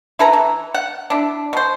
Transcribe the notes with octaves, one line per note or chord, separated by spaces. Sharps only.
E4 A4 B4 A#5
E3
F#5
D4 E4
B2 C5